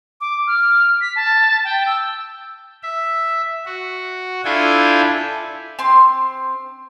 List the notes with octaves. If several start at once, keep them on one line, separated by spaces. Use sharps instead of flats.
D6
F6
B6
A5
G5
E6
E5
F#4
D4 E4 F4 A4 G5 G#5
C4 C6